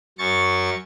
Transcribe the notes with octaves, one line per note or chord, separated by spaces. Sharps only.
F#2 C#6 A6